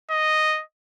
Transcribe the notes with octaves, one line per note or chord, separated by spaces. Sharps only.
D#5